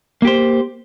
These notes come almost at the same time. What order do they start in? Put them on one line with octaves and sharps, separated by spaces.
A#3 G4 C5